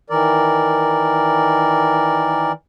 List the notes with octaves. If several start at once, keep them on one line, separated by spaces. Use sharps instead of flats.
D#3 E3 A#4 D5